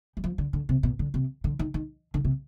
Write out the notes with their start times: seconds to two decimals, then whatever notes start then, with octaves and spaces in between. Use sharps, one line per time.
0.17 G3
0.24 F3
0.38 D3
0.53 D3
0.69 C3
0.83 B2
0.99 D3
1.14 C3
1.44 D3
1.59 D#3
1.74 D#3
2.14 D3
2.25 C3